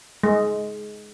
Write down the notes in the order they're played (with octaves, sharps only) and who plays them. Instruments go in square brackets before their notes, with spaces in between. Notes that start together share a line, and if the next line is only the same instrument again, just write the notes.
[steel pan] G#3